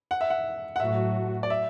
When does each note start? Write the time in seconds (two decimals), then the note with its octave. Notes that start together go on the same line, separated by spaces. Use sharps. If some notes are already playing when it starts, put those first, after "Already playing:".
0.11 F#5
0.21 E5
0.30 F#5
0.76 F#5
0.80 A2 F#3 A3 F#4 E5
1.43 D5
1.50 E5